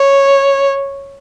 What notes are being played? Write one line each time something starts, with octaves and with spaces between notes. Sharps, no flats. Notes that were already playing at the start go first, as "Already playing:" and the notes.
Already playing: C#5